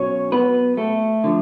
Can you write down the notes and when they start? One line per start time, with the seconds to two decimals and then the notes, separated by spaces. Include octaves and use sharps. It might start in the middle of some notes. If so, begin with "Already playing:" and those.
Already playing: B2 F#3 C#4 C#5
0.32 B3 B4
0.77 A3 A4
1.24 D3 F3